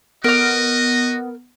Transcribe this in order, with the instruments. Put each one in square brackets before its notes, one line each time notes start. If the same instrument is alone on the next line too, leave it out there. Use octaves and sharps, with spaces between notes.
[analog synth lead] B3 [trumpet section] F#4 D#5 [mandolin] A#4 F6